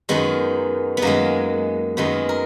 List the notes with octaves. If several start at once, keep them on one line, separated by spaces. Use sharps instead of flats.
F#2 D#3 G#3 B3
B3
F#2 D#3 G#3 A#3
F#2 D#3 G#3 B3
A#4